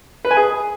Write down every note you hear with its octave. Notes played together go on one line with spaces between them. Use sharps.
B4
G#5
G#4